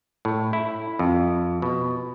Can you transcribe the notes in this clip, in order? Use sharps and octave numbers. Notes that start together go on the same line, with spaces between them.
A2
E4
F2
B2